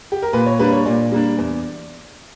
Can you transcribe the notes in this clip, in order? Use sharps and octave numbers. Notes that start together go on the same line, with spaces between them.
G4
A#4
A#2 B4
C#5
G3 A#3 D4 B4
C#5
A#2 D5
G3 A#3 D4
E2